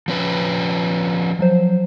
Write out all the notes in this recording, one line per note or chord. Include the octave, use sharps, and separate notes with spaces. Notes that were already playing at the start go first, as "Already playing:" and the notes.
F3 C#4 B4
F3 F#3 C5